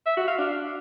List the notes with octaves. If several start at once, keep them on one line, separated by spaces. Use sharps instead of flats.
E5
F#4
F5
D4